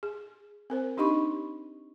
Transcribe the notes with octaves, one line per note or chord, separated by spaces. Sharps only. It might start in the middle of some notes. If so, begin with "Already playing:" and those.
G#4
C4 A#4 C5
D4 D#4 G4 D#5 B5 C#6